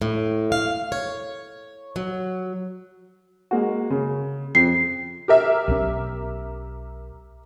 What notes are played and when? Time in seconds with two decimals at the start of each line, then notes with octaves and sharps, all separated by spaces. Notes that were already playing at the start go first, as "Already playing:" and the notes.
0.02 A2
0.52 F5
0.92 C#5
1.96 F#3
3.51 G#3 A#3 F#4
3.90 C#3
4.55 F2 C7
5.28 G4 A#4 E5
5.68 B1 D#3 C#4